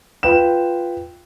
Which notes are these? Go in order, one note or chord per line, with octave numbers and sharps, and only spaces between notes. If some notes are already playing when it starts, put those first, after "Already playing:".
F4 B4 G5 E7